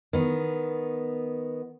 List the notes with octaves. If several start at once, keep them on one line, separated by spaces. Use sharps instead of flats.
D#3 B3